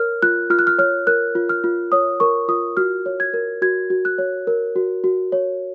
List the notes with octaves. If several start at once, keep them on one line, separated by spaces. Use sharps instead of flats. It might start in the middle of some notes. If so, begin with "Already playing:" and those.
Already playing: A#4 C#5 F6
F4 F#6
F4 F6
F#6
F6
C#5 F6
A#4 F#6
F4
F6
F4
C#5 D#6
A#4 C#6
F4 D#6
F#4 F6
C#5
G#6
A#4
F#4 G#6
F#4
F#6
C#5
A#4
F#4
F#4
C#5